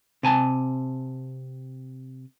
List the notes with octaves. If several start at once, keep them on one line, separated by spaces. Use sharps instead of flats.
C3 G#5 A5